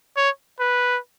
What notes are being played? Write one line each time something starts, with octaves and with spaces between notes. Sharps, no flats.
C#5
B4